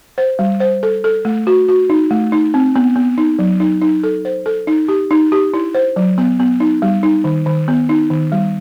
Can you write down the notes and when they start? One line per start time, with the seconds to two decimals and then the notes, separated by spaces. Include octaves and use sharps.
0.18 C5
0.39 G3
0.60 C5
0.83 A4
1.04 A4
1.25 A3
1.47 F#4
1.68 F#4
1.90 D#4
2.11 A3
2.32 D#4
2.54 C4
2.76 B3
2.96 B3
3.18 D#4
3.39 F#3
3.60 D#4
3.82 D#4
4.03 A4
4.25 C5
4.46 A4
4.67 D#4
4.88 G4
5.11 D#4
5.32 G4
5.54 E4
5.74 C5
5.96 F#3
6.18 B3
6.40 B3
6.60 D#4
6.82 G3
7.03 D#4
7.24 D#3
7.46 D#3
7.68 B3
7.89 D#4
8.10 D#3
8.32 G3